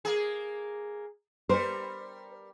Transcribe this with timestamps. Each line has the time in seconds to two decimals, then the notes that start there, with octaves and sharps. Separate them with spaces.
0.05 A#3 G#4
1.49 G3 A#4 C5